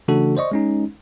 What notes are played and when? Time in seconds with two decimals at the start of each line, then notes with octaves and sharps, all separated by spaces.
0.08 C#3 E3 A3 D4 F#4 A4
0.37 C5 D5 D#5 C#6
0.52 G#3 C#4 D#4